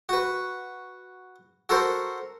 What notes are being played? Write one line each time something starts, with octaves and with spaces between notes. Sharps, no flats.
F#4 B4
F#4 A4 A#4 C5